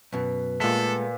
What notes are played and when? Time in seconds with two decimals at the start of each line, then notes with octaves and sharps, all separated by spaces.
0.13 F#2 B2 B4
0.60 A#2 G#3 A3 B3 A4 B6